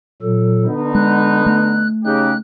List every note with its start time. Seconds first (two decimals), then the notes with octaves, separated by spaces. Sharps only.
0.22 A#2 F#3 A4
0.65 D3 B3 D#4
0.95 G#3 F#6
1.46 A3
2.05 C#3 D#4 G4 F#6